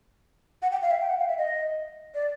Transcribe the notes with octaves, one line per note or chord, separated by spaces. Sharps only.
F#5
G5
F5
E5
G5
F#5
F5
E5
D#5
D5